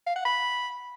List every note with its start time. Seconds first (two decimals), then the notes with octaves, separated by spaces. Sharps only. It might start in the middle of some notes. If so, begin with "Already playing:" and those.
0.06 F5
0.16 F#5
0.25 B5